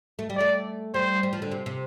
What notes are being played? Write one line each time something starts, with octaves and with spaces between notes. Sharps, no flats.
A3
G3
A3 D5
G3 C5
G3
F3
D3
C3
C3